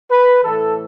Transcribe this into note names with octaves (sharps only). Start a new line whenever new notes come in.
B4
A2 E3 A4